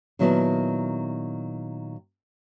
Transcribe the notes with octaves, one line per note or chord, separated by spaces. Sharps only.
A#2 D#3 F#3 B3 E4 A5